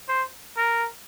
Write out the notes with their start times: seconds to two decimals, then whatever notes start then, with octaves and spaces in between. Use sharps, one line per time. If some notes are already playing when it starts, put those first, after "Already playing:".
0.09 C5
0.57 A#4